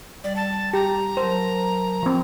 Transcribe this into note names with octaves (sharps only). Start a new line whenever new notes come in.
G3 D5
A5
G4 A#5
F#3 A#4 C5 A5
F3 C4